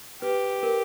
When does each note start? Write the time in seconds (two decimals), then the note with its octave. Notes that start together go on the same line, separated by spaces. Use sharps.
0.22 G4 B4
0.63 A#4